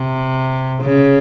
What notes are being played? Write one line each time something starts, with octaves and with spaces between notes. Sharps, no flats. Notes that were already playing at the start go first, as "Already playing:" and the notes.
Already playing: C3
C#3